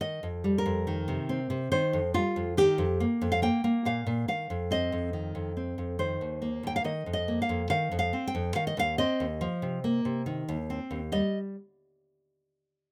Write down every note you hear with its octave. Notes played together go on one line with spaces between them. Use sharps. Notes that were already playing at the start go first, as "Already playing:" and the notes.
D#3 D#5
F2
G3
A#4
F2
D#3
C3
C4
C3
D#3 C5
F2
G3 F4
F2
D#3 G4
F2
A#3
F2
F5
A#3 G5
A#3
A#2 F5
A#2
D#3 F5
F2
C4 D#5
F2
D#3
F2
C4
F2
D#3 C5
D#2
A#3
D#2 G5
F5
D#3 D#5
F2
D#5
A#3
F5
F2
D#3 F5
F2
F5
C4
G5
F2
D#3 F5
D#5
D#2 F5
C4 D#5
D#2
F3
C3
A#3
C3
D#3
D#2
C4
D#2
G3 D#5